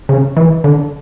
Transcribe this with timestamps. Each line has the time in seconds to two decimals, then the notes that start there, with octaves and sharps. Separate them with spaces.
0.09 C#3
0.37 E3
0.64 D3